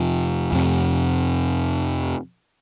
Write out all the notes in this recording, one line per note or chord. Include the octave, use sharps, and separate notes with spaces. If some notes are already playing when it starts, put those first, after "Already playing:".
Already playing: F2 C3 F3
F2 C3